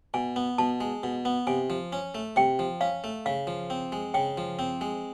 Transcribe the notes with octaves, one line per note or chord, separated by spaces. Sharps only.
B2 G#5
B3
B2 A5
G#3
B2
B3
C3 G#5
F3
C#4
A3
C3 G5
F3
C#4 F5
A3
C#3 F5
F3
C4
G#3
C#3 G5
F3
C4
G#3